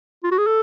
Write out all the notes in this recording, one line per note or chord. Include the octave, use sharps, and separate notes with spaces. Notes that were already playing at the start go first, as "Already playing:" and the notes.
F4
F#4
G#4
A4